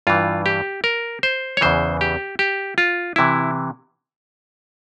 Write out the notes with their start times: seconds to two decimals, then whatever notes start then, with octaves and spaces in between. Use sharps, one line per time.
0.07 G2 E3 F4
0.46 G4
0.84 A#4
1.23 C5
1.57 C#5
1.61 E2 C#3 E3 C5
2.01 G4
2.39 G4
2.78 F4
3.16 C3 E3 E4